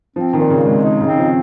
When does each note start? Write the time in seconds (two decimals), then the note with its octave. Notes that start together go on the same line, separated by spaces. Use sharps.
0.16 F3 C4
0.33 D#3
0.39 A#2
0.50 C#3
0.61 G#3
0.67 C3
0.85 D#4
1.01 C#3
1.07 C4
1.18 F3